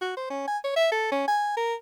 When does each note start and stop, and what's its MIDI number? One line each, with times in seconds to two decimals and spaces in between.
0.01 0.12 66
0.17 0.27 72
0.30 0.47 61
0.48 0.58 80
0.64 0.74 73
0.76 0.89 76
0.92 1.07 69
1.12 1.26 61
1.28 1.53 80
1.57 1.75 70